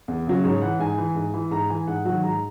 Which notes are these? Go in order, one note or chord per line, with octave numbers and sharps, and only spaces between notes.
E2
C#3 F#3
G#2 C#5
E3 F#5
G#2 G#5
E3
G#2
E3
G#2 A#5
E3 G#5
G#2 F#5
D#3 F#3 F#5
G#2 A#5